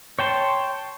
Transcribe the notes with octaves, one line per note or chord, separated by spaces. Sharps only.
C#5 G5 A5 C6